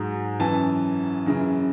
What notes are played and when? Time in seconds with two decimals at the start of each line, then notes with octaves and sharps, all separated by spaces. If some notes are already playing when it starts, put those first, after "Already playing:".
Already playing: G#2 F#3
0.40 F#2 E3 A5
1.26 F#2 C#3 E3